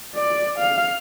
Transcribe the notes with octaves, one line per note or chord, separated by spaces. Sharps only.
D5
F5